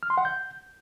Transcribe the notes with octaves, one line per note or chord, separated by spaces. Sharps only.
F6
C6
F#5
G6